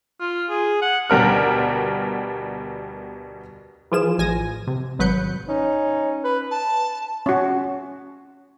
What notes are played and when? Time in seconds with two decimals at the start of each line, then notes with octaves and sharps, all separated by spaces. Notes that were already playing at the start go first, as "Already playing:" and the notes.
0.20 F4
0.49 G#4
0.82 F#5
1.10 D2 B2 G3 A#4 F6
3.92 E3 F3 F4 G#4 E7
4.19 A1 G#5 A#6 D#7
4.67 C3
4.99 G#1 F#3 B4 F#6 G6 C#7
5.49 C#4 D#4
6.24 B4
6.51 A5
7.26 C#4 F#4